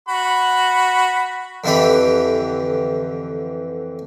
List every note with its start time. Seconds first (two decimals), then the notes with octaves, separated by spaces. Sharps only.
0.09 F#4 B5
1.64 F2 D3 E3 G4 B5